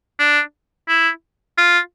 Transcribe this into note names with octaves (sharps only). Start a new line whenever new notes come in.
D4
E4
F4